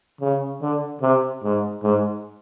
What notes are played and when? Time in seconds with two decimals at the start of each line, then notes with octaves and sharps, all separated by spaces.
0.21 C#3
0.62 D3
1.02 C3
1.43 G#2
1.83 G#2